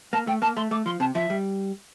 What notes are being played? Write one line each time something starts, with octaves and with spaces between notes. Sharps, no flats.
A#3 A5
A3 G5
A#3 A5
A3 C6
A3 D6
F3 C6
C3 A5
F3 E5
G3